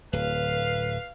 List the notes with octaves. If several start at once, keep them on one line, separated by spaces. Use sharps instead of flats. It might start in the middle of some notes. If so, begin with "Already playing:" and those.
D1 B4 F5